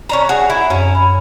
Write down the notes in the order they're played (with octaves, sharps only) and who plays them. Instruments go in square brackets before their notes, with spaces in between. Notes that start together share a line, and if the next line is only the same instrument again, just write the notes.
[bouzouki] C#4 D4 A#5
F#4 G#4
E4
[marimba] F#2 [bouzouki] C#4
[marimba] B5